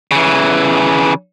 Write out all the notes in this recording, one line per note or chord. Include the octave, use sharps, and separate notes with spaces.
C#3 E3